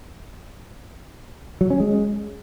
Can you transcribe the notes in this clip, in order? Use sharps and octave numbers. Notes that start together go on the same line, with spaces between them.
F#3
C#4
G#3